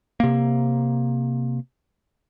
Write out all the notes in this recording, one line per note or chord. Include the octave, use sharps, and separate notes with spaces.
C3 A#3